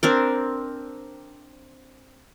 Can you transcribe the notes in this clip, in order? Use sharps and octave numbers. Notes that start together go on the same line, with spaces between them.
C4 D4 A#4